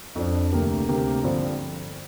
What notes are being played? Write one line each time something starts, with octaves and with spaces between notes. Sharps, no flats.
F2 F3 D4
D2 C3 A#3 G4 A#4
D2 C3 A#3 G4 A#4
G2 D3 F3 C4